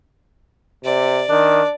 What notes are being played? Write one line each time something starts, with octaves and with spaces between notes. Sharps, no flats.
C3 D5
D#3 D4